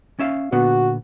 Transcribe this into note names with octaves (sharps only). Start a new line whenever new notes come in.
C#4 E5 F5
A#2 D3 B3 F#4